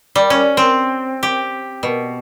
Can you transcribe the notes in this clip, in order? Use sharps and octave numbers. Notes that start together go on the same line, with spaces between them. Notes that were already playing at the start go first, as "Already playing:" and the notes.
G3
C#4
C4
G4
B2